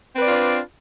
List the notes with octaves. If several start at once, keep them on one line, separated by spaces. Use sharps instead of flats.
C4 D4 F4 B4 D5